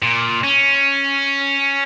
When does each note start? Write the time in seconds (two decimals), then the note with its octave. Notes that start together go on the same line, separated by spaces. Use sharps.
0.03 A#2
0.44 C#4